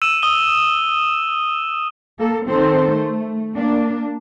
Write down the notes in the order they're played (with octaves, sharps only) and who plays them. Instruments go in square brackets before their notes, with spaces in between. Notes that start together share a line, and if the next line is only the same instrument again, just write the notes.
[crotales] E6 D#7 E7
D#6 G7
[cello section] A#3 A4
D#3 C4 A4 C5
A3
A#3 D4